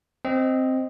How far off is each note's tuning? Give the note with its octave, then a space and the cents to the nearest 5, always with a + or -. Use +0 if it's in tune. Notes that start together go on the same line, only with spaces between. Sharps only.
C4 +0 D#5 +0